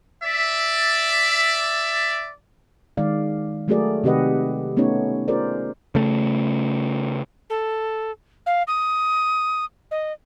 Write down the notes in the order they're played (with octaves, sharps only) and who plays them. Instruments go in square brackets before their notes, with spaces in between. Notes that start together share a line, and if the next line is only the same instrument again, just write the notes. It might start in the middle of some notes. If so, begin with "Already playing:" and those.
[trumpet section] D5 E5
[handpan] D#3 G#3 D5 F5
F#3 A3 F#4 G#4 A#4 D5
C3 D#3 G4 B4 D#5 F#5
A3 B3 C#4 D#4 C#5
F4 G#4 A#4 C5 D5
[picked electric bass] C#3 A3
[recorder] A4
F5
D#6
D#5